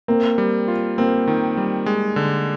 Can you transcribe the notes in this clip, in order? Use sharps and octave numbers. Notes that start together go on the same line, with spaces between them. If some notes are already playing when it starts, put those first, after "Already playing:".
A#3 C4
G3
F4
A#3 C4
D#3
G3
G#3
D3